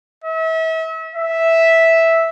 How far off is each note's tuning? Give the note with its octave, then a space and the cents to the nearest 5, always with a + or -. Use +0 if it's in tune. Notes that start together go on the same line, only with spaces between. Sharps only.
E5 -35
E5 -5